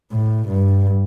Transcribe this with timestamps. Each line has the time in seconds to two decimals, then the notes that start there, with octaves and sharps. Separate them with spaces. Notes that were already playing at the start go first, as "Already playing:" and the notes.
0.12 A2
0.48 G2